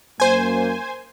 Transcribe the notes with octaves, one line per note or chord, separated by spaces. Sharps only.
F#2 A#3 C5 G#5